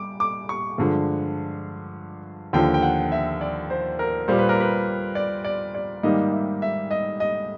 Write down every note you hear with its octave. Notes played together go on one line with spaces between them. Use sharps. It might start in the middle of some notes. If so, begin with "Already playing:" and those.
Already playing: G3 D6
D6
C#6
G2 D3 F3 G#3
D#2 D3 F3 G5
G5
F#5
E5
D5
C5
A#4
A#2 G3 A#3 C5
B4
A#4
B4
D5
D5
D5
G#2 D#3 G3 A#3 D#5
E5
E5
D#5
D#5